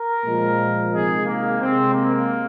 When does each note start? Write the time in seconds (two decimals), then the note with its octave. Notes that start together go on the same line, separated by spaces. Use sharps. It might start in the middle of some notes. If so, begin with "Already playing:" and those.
Already playing: A#4
0.23 A#2 F3 G#3
0.92 C3 D#3 G#3 G#4
1.26 A#3
1.60 C3 G#3 C4
1.94 A#3